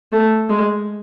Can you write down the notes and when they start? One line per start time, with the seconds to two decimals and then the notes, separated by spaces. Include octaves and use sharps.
0.12 A3
0.49 G#3